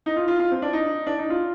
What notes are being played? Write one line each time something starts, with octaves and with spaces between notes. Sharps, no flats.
D#4
F4
F4
F4
C4
D4
D#4
D4
D#4
F4